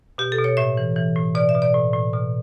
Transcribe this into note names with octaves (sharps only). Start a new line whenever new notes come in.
B2 G4
A4
B2
C#5
A2 E5
E3
E3
A2
B2 D5
E5
B2
D5
A2
A2
B2